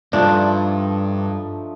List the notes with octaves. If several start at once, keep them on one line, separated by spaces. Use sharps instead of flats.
G2 F3 A3 D4 D#4